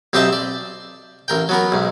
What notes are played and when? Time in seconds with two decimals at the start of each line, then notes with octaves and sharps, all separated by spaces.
0.13 B1 C4 G4 D#5 E5 A5
0.33 D5
1.28 A1 A#4 G5
1.49 F#3 B3 A#4
1.72 B1 G#2